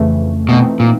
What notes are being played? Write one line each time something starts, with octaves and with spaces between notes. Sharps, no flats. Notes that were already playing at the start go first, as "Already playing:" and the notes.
Already playing: F2 C#3 E3 A3
B2 E3 A3 C4 D#4
A#2